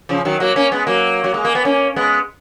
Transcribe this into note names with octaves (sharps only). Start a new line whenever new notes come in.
C#3 F3
D#3 F#3
F#3 A#3
A#3 C#4
G#3 B3
F#3 A#3
F#3
G#3
A#3
B3
A#3 C#4
G#3 B3